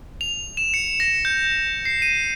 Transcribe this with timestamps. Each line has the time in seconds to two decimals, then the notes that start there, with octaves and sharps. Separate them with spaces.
0.21 F7
0.57 E7
0.74 C#7
1.00 A#6
1.25 G6
1.85 C7
2.02 D#7